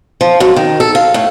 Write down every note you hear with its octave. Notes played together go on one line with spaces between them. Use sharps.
F3
F#2
D#3
A4
F5
A2